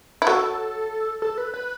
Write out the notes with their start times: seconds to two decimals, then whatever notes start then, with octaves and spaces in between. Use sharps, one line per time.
0.22 E4
0.27 F#3 F#4 A4
1.22 A4
1.38 B4
1.54 B4